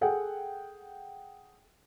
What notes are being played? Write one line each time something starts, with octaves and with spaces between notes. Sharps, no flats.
G#4 A4 F#5 G5